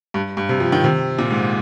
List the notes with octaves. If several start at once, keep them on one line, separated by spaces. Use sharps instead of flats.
G2
G2
C3
F3
D#3
C3
A#2
G#2